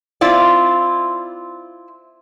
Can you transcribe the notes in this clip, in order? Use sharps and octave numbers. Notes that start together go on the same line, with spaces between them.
C4 E4 F4 D5